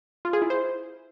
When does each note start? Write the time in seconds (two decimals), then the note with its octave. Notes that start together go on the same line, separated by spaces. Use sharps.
0.25 F4
0.33 G#4
0.42 E4
0.50 C5